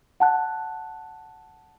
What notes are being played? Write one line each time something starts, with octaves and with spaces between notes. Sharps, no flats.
F#5 A5 F#6